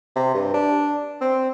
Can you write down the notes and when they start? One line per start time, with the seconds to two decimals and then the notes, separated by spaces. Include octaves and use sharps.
0.16 C3
0.34 G2
0.54 D4
1.21 C4